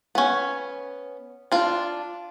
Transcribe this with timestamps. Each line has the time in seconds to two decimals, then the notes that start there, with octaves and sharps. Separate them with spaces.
0.15 B3 C#4
1.52 D4 F4